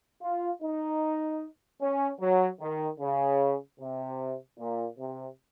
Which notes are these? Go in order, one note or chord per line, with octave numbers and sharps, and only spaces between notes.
F4
D#4
C#4
F#3
D#3
C#3
C3
A#2
C3